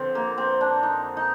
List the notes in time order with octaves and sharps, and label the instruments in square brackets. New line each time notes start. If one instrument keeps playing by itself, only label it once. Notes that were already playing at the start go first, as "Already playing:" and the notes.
Already playing: [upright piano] F2 D3 [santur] C4
[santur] A#3
C4
D4
D#4
D#4